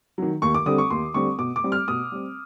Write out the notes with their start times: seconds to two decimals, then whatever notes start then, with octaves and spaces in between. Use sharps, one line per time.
0.18 D#3 F#3
0.42 D#2 C#6
0.55 D6
0.66 D3 G3 C4 D#6
0.78 C#6
0.90 D#2 C6
1.14 D3 G3 C4 C#6
1.39 B2 D6
1.56 D6
1.64 G3 C4
1.72 F6
1.88 B2 D#6
2.12 G3 C4